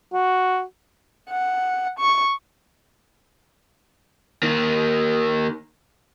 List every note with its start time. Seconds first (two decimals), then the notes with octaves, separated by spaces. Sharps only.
0.13 F#4
1.31 F#5
1.99 C#6
4.43 D#3 A#3